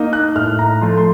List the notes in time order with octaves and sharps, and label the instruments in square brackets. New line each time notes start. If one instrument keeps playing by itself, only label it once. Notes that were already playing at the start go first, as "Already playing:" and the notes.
Already playing: [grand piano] A#3 D#4
F#6
A2 F6
A#5
F3 A3 C6
C6